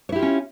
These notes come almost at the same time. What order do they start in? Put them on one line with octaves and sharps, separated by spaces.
C#5 E4 G4 F4 C#4